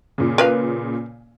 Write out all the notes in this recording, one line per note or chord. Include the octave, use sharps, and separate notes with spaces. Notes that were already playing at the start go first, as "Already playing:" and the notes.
A#2 C#3
A#4 B4 F5